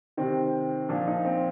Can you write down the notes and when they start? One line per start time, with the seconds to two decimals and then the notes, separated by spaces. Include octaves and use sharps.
0.17 C3 D#3 C4
0.89 A#2 F3 D4
1.07 D#4
1.25 C4